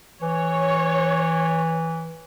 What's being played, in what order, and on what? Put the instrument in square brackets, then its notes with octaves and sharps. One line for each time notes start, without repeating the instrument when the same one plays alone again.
[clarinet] E3 [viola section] C#5